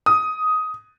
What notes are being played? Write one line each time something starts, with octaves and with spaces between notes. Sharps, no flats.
D#6